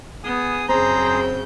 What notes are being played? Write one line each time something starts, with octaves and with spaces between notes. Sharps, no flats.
B3 G#4 G#5 D#6
F#2 C#3 C4 G#4 C5 A#5 G6